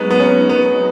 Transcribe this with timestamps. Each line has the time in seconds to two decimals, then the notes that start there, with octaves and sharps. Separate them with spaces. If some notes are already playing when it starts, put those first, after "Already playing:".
Already playing: F#3 G#3 B3 D#4
0.11 B3
0.20 C#4
0.49 B3